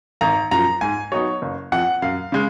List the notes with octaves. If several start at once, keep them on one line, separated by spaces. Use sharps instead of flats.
G#1 A#5
F#2 F3 A#5
G#2 G#5
F#3 B3 D#4 C#5
F#1
F2 F3 F#5
F#2 F5
C#3 G#3